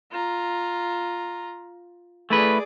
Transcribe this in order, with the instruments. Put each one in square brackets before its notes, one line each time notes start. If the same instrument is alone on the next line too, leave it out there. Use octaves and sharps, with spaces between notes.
[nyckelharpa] F4 A#5
[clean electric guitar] A3 E4 B4 [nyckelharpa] G#4 D5